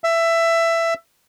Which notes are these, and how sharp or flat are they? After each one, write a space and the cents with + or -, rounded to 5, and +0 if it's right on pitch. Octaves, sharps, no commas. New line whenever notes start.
E5 +15